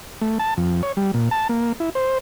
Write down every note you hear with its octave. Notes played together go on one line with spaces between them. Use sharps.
A3
A5
F2
C#5
G3
A#2
A5
A#3
E4
C5